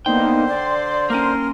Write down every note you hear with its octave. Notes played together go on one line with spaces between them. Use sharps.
D3 A#3 B3 D#4 C5 G5
D5 C6
A#3 C#4 A#4